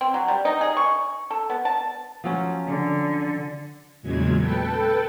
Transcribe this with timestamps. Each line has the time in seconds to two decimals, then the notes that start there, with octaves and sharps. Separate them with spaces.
0.01 C4
0.14 F#3
0.28 G3
0.45 D#4
0.61 G#4
0.77 C#6
1.31 A4
1.50 B3
1.65 A5
2.24 F3 F#3 C#4
2.67 D3
4.02 E2 A#2 C#3 F#3 G#3 G#6
4.39 A4 B4 G5 A5